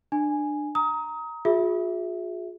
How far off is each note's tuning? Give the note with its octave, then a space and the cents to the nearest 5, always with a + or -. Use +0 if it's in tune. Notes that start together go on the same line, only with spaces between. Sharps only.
D4 +20 G#5 +0
A#5 +0 D#6 +30
F4 +45 G#4 +0 E5 +0